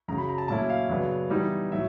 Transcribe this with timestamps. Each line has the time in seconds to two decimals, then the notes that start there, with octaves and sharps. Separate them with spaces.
0.08 F#2 C#3 F#3 A#5
0.18 B5
0.29 A#5
0.38 A5
0.48 A#2 F#3 A3 C#4 E4 A5
0.70 F5
0.89 F#2 C#3 F#3 B3 D4
1.30 E3 G3 B3 D#4
1.72 A2 F#3 E5